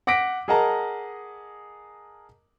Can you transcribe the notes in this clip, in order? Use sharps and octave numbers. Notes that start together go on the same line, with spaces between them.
F#5 D6 A#6 B6 D7
G#4 A#4 D#5 F#5 A5 A#5